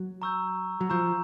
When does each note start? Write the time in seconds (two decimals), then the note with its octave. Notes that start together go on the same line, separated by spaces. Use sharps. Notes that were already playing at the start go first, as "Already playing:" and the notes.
Already playing: F#3
0.22 A#5 C#6 E6 G6
0.81 F#3
0.90 F3 A#5 C#6 E6 G6